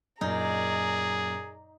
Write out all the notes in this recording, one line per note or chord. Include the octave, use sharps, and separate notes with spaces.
F#2 A#2 D#4 G#4 D5 A#5